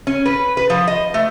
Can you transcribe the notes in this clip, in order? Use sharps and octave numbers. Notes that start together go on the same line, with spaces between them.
C#4
B4
B4
F3
D#5
A3